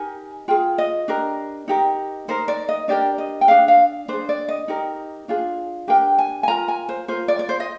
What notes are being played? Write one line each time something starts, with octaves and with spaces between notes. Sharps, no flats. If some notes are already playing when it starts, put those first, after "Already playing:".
Already playing: D#4 G4 A#4 G#5
F4 G#4 G5
D#5
D4 G4 A#4
D#4 G4 A#4
D#4 A#4 C5
D5
D#5
D4 G4 A#4 D5
D#5
G5
D4 G#4 F5
F5
D4 G#4 C5
D5
D#5
D#4 G4 A#4
D4 F4 G#4
D4 G4 A#4 G5
G#5
G#5
F4 A#4 A#5
G#5
C5
F4 A#4 C5
D5
D5
C5
D#5